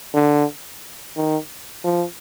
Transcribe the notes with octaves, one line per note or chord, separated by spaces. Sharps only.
D3
D#3
F3